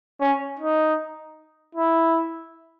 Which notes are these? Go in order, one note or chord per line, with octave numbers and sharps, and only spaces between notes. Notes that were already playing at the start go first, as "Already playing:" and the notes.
C#4
D#4
E4